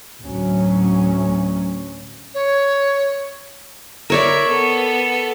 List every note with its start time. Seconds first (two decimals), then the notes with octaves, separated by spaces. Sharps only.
0.23 D2 A2 F#3 C#4
2.34 C#5
4.10 A#4 C#5 D5 E5 B5
4.49 B3 A4